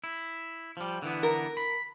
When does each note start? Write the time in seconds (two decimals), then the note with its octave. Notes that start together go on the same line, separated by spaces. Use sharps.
0.04 E4
0.77 F3 G3
1.02 D3 E3 B3
1.23 A#4
1.57 B5